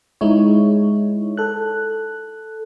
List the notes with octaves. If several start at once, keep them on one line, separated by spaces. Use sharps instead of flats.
G#3 D#4 E4 C#5
A4 F#6